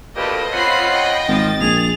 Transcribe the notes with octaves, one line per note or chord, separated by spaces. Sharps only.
D2 A#2 G4 A4 B4 C5 D#5
C4 C#4 F4 F#5 B5 C7
D#5 G5
G#1 D#3 F3 A6
A#1 G#4 F7